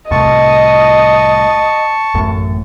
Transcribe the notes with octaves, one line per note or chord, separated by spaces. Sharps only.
C2 A2 D#5 A5 C#6
A1 F#2 A2